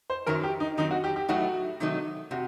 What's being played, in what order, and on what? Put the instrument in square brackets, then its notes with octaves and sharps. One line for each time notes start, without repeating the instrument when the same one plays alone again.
[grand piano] C5
[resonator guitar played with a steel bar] F#2 D#3 F#3 [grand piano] A#4
[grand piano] G4
D#4
[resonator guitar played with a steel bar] D#3 F#3 C4 [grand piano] D#4
[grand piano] F#4
G4
G4
[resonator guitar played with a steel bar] A2 F#3 A3 D#4 [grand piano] F#4
[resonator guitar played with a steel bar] C3 D#3 F#3 A3 D#4
[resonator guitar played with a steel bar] C3 [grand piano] F#4